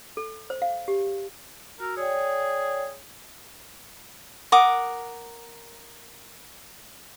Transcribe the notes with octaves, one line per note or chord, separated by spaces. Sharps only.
A4
C5
F5
G4
F#4 A#4 E6
G#4 C#5 D5 G5
A#4 F#5 D6 D#6